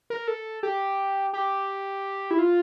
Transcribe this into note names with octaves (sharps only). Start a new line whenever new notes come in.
A#4
A4
G4
G4
E4
F4